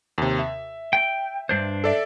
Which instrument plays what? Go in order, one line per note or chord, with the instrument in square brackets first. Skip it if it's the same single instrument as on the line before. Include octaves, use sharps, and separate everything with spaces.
[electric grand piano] D#2 C3
E5
[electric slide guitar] G5
G2 D4 C5
[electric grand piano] A4 D5 E5